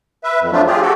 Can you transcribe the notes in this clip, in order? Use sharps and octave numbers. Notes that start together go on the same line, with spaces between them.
B4 E5
F2
F3 F#3 A3 D4 F4
F4 G4 G#4
F#4 G4 A4